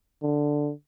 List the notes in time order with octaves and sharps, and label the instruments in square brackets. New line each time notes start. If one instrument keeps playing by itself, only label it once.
[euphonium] D3